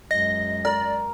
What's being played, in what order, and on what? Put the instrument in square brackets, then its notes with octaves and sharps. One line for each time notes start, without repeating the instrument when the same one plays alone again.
[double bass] F#2 G#3 [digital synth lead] D#5 [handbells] A#6
[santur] A#4 [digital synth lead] D5